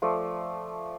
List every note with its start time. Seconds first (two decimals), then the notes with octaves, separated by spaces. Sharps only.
0.02 F3 A3 D5